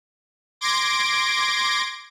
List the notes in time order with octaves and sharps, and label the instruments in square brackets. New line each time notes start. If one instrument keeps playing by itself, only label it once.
[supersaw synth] C6 D6 G#6 A#6 D7